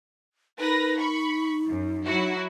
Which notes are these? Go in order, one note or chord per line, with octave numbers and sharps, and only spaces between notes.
D#4 A#4 B4 A#6
B5 C#6
F#2
F#3 E4 F#4